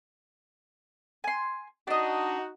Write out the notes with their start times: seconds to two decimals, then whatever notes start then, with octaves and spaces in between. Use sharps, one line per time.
1.24 G#5 C6
1.87 D4 D#4 F#4 D#5